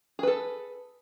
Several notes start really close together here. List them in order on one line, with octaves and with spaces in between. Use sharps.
G#4 B4 A4